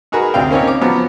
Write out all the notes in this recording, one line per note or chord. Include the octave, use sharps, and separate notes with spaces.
D#4 F#4 G#4 A#4 B4
D2 C3 F5 G5
A#3 C4 C#4 D#4 A#4 C#5
D6
F3 F#3 B3